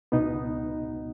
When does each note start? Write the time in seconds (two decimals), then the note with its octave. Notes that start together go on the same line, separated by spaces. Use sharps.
0.12 C#2 B2 B3 D#4